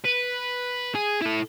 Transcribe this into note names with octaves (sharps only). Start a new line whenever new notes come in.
B4
G#4
E4 A4